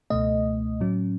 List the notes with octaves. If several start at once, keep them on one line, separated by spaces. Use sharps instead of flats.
C#2 B2 A3 D#5
A2 F#3 C#4